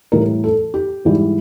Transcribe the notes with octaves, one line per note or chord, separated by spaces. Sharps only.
A2 E3 G3 A#4
A4
G4
G#2 E3 G3